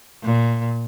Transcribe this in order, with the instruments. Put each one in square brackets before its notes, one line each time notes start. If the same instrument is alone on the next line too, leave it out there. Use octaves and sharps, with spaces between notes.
[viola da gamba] A#2